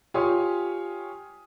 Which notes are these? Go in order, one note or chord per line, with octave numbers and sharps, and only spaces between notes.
F4 G4 C#5 G#5 D#6